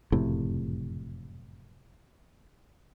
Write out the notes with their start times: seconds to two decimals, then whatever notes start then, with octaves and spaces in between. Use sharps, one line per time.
0.12 F#1 F2 A2 C3